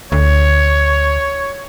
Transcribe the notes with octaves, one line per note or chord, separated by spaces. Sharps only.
D2 C#5